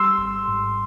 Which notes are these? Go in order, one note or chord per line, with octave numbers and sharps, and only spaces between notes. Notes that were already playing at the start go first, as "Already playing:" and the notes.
Already playing: G3 C6 E6
G#1
G#2